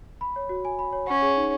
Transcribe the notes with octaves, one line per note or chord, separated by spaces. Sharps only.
B5
C#5
F#4
G#5
B5
C#5
C#4 F#5
G#4
D#4